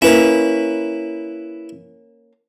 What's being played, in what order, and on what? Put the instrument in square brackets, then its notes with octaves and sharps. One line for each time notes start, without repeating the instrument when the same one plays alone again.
[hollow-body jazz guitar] A#3 C#4 [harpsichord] E4 B4